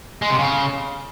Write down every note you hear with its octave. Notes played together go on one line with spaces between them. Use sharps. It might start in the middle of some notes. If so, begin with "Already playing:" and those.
G#3
C3
C#3